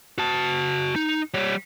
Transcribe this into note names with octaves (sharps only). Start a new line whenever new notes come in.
F#4 A5
D#4
G3 C#5